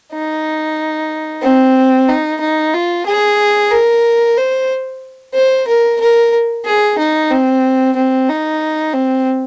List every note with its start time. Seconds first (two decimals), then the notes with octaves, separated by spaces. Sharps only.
0.12 D#4
1.42 C4
2.08 D#4
2.40 D#4
2.74 F4
3.06 G#4
3.71 A#4
4.37 C5
5.35 C5
5.68 A#4
6.01 A#4
6.65 G#4
6.98 D#4
7.31 C4
7.96 C4
8.29 D#4
8.94 C4